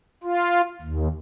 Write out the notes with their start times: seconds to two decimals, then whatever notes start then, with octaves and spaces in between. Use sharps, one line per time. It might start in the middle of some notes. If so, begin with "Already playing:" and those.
0.23 F4
0.81 D#2